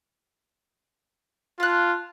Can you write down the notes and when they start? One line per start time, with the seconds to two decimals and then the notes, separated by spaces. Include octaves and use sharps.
1.60 F4 A5 F#6